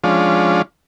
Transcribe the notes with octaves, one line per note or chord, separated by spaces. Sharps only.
F3 G#3 C#4 D4 F4